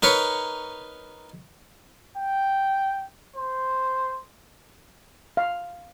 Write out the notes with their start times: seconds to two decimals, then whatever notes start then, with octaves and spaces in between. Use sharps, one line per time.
0.03 D#4 A#4 B4 C#5
2.17 G5
3.36 C5
5.37 F5